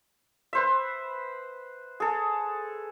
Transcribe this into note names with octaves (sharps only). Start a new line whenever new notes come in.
B4 C5 E5
G#4 A4